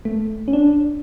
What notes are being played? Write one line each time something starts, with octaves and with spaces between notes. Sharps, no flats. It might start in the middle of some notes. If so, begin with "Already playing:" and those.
A3
C#4
D4